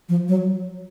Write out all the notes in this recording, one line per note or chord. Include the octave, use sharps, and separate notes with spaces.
F3
F#3